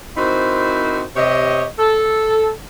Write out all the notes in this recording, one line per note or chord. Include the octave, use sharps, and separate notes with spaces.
C4 D#4 E4 F#4 A#4 C5
C3 G4 C#5 D#5
A4